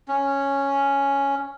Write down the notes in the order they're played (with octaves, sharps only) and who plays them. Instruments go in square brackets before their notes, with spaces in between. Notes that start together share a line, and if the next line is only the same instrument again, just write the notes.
[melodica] C#4